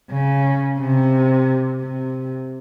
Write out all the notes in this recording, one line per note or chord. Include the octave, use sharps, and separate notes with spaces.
C#3
C3
C3